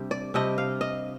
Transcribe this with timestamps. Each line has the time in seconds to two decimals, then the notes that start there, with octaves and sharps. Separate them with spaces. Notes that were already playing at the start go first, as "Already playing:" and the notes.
Already playing: C3 G3 D4
0.11 D5
0.34 C3 G3 D4 D#5
0.58 F5
0.81 D#5